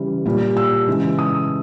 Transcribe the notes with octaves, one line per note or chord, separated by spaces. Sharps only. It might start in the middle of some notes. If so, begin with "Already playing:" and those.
Already playing: C#3 E3 G3
A#2 G3
E6
C#3 E3 G#3
D#6